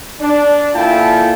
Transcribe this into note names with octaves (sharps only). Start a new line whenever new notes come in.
D4
A#2 E4 F4 A4 G5 A5